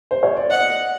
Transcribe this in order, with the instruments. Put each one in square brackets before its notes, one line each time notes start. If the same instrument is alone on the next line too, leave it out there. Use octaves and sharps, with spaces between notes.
[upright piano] C5
C#5
D5
[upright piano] D#5 [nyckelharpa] F#5